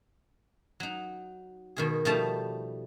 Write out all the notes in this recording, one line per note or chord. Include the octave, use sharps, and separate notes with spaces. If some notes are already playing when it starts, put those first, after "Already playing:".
F#3 D#4
B2 D#3 G#4
B2 F3 G3 A3 D#4 A5